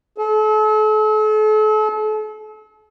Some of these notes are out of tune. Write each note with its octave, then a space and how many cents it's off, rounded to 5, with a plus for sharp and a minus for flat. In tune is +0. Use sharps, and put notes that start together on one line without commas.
A4 -40